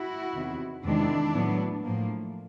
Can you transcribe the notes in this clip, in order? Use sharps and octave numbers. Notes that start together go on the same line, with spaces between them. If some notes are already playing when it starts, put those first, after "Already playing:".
Already playing: E4 F#4
E2 C3 D#3
E2 C3 D#3 G#3 D4 E4
A2 F#3 B3
A2 F3 A#3